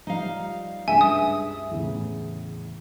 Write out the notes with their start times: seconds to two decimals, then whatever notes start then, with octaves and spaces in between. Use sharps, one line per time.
0.07 F3 G3 D#4 F5
0.88 C#2 G2 E5 G#5
1.01 D#6
1.71 E2 A2 C#3